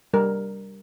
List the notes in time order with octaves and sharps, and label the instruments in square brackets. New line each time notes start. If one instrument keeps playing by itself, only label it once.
[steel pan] G3 A#4